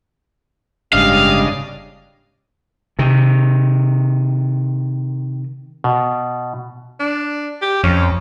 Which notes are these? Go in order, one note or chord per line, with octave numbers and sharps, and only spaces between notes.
F#1 G#2 C#3 G3 D4 D#5 F5
C3 D#3
B2
D4
G4
F2 C#4